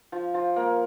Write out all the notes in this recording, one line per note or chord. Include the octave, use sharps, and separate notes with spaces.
F3
F3
A#3